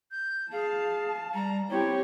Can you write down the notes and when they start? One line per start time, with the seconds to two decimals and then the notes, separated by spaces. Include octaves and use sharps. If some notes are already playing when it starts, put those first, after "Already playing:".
0.11 G6
0.52 G#4 F5 A5
1.34 G3 A#5
1.70 C4 E4 G4 C#5